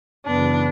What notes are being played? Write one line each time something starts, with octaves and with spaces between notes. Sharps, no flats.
F#2 C#3 E3 B3 D4